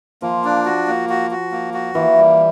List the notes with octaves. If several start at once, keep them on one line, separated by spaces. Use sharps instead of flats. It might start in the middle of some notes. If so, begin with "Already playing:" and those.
F3 A#3
D4
F#4
A#3
F#4
F#4
A#3
F#4
E3 A#3
G3